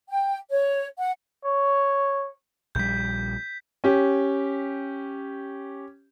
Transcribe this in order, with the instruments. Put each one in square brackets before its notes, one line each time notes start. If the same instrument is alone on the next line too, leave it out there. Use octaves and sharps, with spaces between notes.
[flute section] G5
C#5
F#5
[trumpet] C#5
[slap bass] A#1 G3 [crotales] G6 B6
[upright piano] C#4 G4